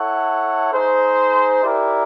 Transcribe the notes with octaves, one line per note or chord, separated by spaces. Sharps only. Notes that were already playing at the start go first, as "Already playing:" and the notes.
Already playing: E4 A4 C#5 F#5
D#4 G#4 C5
E4 G4 A#4 D5